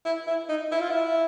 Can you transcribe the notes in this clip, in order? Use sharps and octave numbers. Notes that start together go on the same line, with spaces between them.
E4
E4
D#4
E4
F4
E4